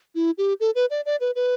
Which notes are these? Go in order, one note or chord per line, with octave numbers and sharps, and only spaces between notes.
E4
G4
A4
B4
D5
D5
B4
B4